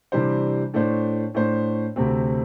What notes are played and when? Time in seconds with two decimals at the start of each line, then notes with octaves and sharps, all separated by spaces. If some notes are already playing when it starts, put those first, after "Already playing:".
0.12 C3 E3 G3 D4 C5
0.74 A2 A3 D4 C5
1.34 A2 A3 D4 C5
1.96 D2 C3 A3 C4